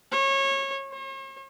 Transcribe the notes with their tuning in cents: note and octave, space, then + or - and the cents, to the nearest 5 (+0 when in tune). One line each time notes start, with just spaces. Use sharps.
C#5 -25
C#5 -45